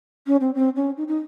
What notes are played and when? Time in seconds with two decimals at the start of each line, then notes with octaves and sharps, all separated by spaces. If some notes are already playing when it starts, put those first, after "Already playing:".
0.27 C#4
0.41 C4
0.55 C4
0.76 C#4
0.97 D#4
1.08 D#4